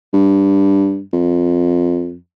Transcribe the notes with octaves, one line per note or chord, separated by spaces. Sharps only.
G2
F2